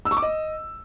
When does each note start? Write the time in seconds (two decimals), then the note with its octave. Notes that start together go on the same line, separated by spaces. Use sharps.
0.05 E6
0.11 C#6
0.17 D6
0.22 D#5